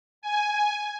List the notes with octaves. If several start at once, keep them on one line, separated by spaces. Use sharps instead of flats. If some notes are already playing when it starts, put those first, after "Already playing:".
G#5